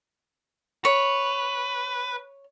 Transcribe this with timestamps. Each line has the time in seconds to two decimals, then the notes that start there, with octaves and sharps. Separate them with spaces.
0.85 B4 C#5